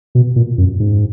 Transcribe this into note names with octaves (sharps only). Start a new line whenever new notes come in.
B2
A#2
F#2
G#2